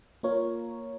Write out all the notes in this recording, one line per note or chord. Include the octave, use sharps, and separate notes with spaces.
A#3 F4 A#4 C#5